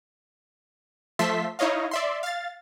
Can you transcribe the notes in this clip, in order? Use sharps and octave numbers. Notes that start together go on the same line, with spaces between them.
F3 A3 E5 A5 C6 B6
D#4 E4 C#5 D#5 F5
D5 E5 C6
F5 A6